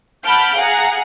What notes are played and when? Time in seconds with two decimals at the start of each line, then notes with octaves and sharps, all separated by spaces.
0.24 F#5 A5 B5 F6 G6 D7
0.55 G#4 F5 F#5 A#5